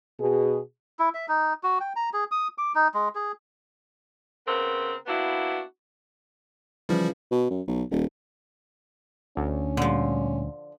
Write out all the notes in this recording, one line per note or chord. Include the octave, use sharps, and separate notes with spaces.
B2 G#4
E4
E5
D#4
F#4
G5
A#5
G#4
D#6
D6
D#4
G#3
G#4
C#3 B3 C4 A#4
A#3 B3 D4 E4 F#4
C#3 E3 F3 G3 F4
B2
F#2
B1
D#1
D2 C#4
A#2 D3 F3 G3